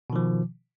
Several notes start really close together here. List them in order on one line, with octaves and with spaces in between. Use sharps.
B2 D#3 F3